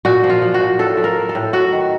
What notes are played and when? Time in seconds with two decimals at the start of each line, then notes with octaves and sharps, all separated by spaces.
0.05 A#2 F#4
0.24 F3
0.30 F4
0.42 F3
0.54 F#4
0.60 A#2
0.79 A2 A4
0.97 F3
1.04 A#4
1.16 F3
1.29 A4
1.35 A2
1.53 F#3 F#4
1.72 D#3